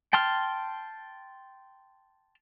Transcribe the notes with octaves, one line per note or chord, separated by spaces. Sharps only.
G5 A5 C6 F6